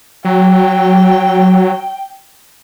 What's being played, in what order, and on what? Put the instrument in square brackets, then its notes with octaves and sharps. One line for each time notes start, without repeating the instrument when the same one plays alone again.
[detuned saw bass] F#3 [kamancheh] G5